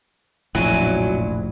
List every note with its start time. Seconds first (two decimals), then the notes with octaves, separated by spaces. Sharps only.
0.55 F1 A#1 A2 F3 F#3 C#4 E4 G#5